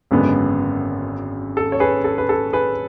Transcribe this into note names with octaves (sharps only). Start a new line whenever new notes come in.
G#1 F#2 D3 G#3 B3
A4
C#5
G#4 B4
A4
B4
A4
G#4 B4